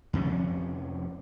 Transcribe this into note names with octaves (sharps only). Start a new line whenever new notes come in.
F2 C3 F3 C#4